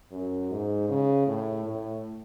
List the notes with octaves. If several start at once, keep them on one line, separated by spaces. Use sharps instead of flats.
F#2
G#2
C#3
A2
A2